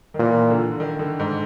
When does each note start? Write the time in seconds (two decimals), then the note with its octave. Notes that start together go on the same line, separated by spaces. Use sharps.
0.14 D#3
0.20 A#2 E3
0.50 D3
0.80 D#3
0.99 D3
1.19 G#2